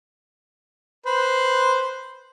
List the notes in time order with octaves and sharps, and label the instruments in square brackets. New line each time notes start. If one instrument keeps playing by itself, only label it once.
[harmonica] B4 C5